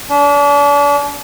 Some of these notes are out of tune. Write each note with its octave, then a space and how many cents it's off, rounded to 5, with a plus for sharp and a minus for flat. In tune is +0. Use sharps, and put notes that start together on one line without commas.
D4 -40